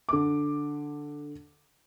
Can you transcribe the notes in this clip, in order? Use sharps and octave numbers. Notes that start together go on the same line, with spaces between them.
D3 D6